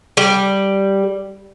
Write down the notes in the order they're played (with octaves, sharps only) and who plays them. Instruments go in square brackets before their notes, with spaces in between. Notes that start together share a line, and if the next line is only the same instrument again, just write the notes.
[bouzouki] G3